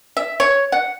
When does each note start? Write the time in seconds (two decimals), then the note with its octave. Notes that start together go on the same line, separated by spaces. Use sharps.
0.17 E5
0.40 C#5
0.72 F#5